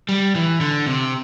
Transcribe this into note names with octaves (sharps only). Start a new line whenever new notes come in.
G3
E3
D3
C3